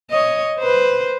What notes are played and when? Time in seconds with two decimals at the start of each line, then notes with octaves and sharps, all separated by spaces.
0.11 C#5 D#5
0.59 B4 C5